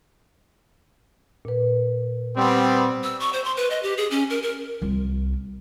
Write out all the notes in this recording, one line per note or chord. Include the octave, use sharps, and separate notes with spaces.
A#2 B4
G3 B3 C4
E6
C#6
C5
C6
B4
D#5
G4
G#4
C#4
A#4
A#4
C2 F4